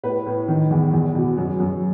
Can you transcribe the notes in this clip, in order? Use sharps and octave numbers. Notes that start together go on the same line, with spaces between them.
A2 B4
A2
D#3
E2
E2
B2
F#2
F#2